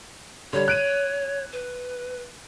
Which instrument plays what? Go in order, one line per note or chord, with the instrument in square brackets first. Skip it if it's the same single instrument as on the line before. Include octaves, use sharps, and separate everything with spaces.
[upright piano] D3 G3 [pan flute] C#5
[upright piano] F#6 D7 D#7
[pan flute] B4